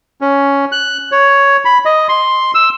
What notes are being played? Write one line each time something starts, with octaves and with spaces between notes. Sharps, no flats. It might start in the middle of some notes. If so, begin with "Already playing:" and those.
C#4
F#6
C#5
B5
D#5
C6
E6